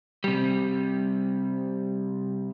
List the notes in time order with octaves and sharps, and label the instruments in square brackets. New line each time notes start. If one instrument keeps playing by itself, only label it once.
[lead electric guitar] C3 G3